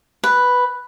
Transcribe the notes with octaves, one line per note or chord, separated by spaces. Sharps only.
B4